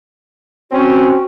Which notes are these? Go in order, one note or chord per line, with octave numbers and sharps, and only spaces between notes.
C4 C#4 F#4